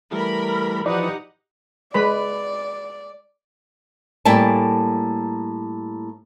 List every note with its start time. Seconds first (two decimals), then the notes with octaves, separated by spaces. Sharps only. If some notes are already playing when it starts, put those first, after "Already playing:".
0.12 E3 G3 A3 A#4 B5
0.86 E3 F3 D#4 G4 B4 D5 F#5
1.94 G#3 B4 D5 B5
4.25 A2 G3 A#3 E5 G#5 A5